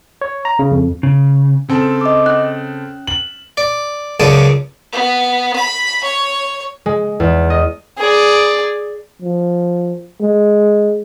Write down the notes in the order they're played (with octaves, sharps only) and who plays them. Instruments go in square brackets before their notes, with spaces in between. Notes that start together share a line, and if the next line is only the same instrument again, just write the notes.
[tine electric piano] C#5
A#5
C#3
F2
[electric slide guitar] C#3
[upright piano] C#3 C4 A4
[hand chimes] D#5 D6
C#4 F#6
[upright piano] F#7
[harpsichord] D5
C#2 F#2 C#3 D5 A5 D#6
[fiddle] B3
B5
C#5
[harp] G#3
E2
D#5
[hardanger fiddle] G#4 D5
[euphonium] F3
G#3